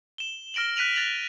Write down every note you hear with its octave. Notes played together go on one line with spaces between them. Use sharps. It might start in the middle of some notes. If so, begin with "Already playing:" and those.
E7 G7
F6 A#6 D7 E7 F#7
F#6 B6 D#7 F7 F#7
F#6 A6 A#6 F7 F#7